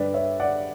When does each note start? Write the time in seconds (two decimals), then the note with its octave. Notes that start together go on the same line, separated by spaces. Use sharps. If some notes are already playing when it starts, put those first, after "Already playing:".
Already playing: G2 D3 G3 B4 D5
0.14 C#5 E5
0.40 D5 F#5